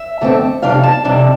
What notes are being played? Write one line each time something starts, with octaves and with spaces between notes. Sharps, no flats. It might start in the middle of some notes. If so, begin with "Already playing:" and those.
Already playing: E5
F2 D3 A3 C4
F2 C3 G3 D4 F5
A5
F2 C3 G3 D4